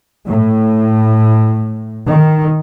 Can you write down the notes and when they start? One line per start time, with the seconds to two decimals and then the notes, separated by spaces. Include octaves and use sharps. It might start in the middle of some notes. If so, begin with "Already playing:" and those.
0.24 A2
2.08 D#3